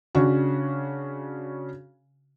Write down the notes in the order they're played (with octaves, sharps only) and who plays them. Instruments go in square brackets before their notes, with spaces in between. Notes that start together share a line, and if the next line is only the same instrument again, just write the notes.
[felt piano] C#3 C#4 D4 F#4